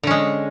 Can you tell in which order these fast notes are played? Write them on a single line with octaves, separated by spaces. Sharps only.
D3 C#4 G#3